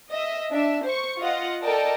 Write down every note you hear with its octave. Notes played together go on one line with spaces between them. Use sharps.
D#5 E5
D4 E5
C5 C#6
F4 D#5 F#5
A4 A#4 D5 D#5 G5 A5